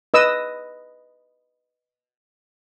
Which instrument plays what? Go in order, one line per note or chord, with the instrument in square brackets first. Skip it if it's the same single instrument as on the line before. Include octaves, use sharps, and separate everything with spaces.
[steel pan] B4 D#5 E6